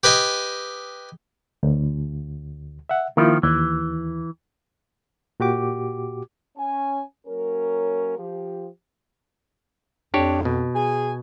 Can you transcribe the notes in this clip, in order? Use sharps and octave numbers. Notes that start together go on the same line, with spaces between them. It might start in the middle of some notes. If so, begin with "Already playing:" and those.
G4 B4 D#5 G#5
D2
E5 F#5
D#3 F3 A#3 E4 F4
D#2 E3
A#2 F#4 G4 D6
C#4 G#5
F#3 A#3 C#4 A#4
F3 G4
F2 D4 G4 C#5
B2
G#4 G#5